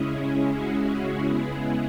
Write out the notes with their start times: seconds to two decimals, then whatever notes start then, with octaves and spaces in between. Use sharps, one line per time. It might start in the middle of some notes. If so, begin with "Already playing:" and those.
Already playing: C#3 G#3 C#4 E4 G#4
0.21 G#4
0.56 F#4
1.27 C#3 G#3 B3 E4 G#4